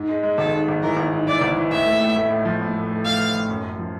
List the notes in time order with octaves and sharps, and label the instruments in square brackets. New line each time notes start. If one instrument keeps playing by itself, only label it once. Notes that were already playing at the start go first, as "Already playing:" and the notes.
Already playing: [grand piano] G#2
G#3
G#3
[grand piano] G#1 [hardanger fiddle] A4
[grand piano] G#2
G#1
[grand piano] E3 [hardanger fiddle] A#4
[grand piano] G#1
G#2
[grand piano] E3 [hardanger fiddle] D5
[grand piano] G#1
E3
[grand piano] A1 [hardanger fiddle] E5
[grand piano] A3
A2
A3
A2
F3
A2
A3
A3
[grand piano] A3 [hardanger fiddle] F5
[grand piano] A1
A1
F#2
F#2
F3